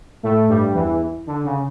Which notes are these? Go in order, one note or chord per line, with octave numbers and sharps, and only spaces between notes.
A2 A3
G2 G3
E2 E3
D3
C#3